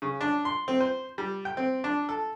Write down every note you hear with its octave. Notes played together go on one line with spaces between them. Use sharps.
C#3
D4
C6
C4
C5
G3
G5
C4
D4
A4